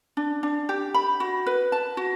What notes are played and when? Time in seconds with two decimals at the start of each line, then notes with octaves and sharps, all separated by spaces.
0.17 D4
0.43 D4
0.69 G4
0.94 B5
1.20 F#4
1.46 B4
1.72 A5
1.97 F#4